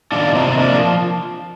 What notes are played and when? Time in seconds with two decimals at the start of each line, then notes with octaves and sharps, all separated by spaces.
0.12 D#3 D4 F4
0.35 C3 C4 D#4
0.58 F3 A#3 D4